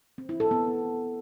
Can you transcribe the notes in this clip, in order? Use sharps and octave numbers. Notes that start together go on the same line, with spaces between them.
C4
E4
A4
B3